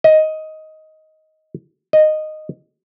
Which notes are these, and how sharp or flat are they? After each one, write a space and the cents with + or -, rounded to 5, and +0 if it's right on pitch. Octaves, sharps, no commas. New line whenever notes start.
D#5 +10
D#5 -10